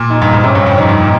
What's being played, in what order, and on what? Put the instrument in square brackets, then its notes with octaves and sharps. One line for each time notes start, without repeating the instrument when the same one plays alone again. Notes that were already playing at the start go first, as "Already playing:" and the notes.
Already playing: [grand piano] A#2
[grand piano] A#2 [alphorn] D#4
[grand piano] G2
G#2
[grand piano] C3 [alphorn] C#4
[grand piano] G2
F2
[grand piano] G2 [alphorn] D#4
[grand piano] G2
A#2